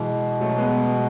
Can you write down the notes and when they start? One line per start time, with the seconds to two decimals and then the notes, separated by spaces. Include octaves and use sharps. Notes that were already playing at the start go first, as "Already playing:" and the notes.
Already playing: B2 E3 G#3
0.41 F#3 A3
0.58 G#3 B3